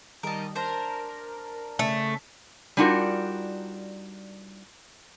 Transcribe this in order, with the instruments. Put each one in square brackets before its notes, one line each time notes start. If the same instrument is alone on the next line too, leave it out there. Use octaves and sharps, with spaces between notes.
[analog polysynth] D#3 G3 D#5 [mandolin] A#4 A5
[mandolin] D4 C5 A#5 [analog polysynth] A#4
[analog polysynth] C#3 [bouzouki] A3
[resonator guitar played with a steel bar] G3 D4 D#4 F4 F#4 A#4